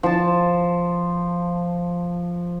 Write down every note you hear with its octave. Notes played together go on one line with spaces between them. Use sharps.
F3 A5